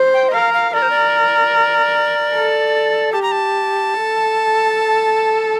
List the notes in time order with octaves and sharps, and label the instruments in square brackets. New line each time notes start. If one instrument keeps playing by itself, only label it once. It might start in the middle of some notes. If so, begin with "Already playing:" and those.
Already playing: [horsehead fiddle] C5
[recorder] G5
D#5
[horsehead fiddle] A#4 [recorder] F5
[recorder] F5
[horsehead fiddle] A#4 [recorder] D5
[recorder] C5
D5
[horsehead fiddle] A4
[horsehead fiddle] G4 [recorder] A5
[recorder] A#5
A5
[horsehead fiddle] A4